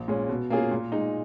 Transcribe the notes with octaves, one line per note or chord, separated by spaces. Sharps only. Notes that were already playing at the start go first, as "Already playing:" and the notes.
Already playing: A#1
A#2 G#3 C#4
B2
A#3 C#4 F4 G#4
A#2
G#3 D#4